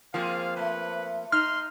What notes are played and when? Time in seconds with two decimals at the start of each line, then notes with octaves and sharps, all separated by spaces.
0.14 F3 A#3 C4 F4 G#4 F5
0.56 A3 B4
1.32 D#4 C6 F6